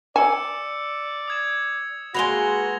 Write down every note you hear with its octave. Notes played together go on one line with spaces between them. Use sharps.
D5 G#5 E6 C#7 E7
D#6 G#6 E7
G#3 A#3 F#4 B4 A#6 F7 G7